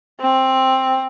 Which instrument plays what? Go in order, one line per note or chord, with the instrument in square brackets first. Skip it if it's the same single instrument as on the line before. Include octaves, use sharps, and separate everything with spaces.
[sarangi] C4